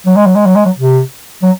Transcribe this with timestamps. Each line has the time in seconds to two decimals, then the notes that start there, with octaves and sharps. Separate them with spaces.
0.06 F#3
0.16 G#3
0.26 F#3
0.36 G#3
0.46 F#3
0.56 G#3
0.66 F#3
0.78 C3
1.43 F#3